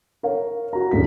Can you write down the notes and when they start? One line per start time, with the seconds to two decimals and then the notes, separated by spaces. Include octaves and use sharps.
0.23 A#4 C#5 F5
0.73 F#4 A#5
0.91 D#1 A#1 A2 B6